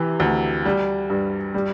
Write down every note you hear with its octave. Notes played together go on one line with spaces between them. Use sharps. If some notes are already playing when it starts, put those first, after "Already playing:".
Already playing: C3 E3
D2
G3
G2
G3